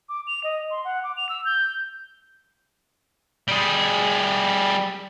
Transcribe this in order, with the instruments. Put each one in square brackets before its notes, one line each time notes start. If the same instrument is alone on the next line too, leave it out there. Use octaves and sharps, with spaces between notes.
[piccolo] D6
F7
D#5
C6
F#5
D6
F7
E6
G6
[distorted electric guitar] G3 G#4